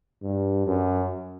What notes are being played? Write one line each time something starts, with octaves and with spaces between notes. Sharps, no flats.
G2
F#2